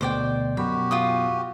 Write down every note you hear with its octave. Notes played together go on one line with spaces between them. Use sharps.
D2 B2 C5 D5 G5
F#2 B2 F#4 G4 B5
F4 G5 D#6